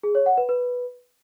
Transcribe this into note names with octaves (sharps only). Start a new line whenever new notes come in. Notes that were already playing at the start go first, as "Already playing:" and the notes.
G#4
C#5
F#5
B4
B4